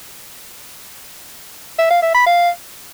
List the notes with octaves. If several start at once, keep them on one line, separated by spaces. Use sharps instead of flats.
E5
F5
E5
B5
F5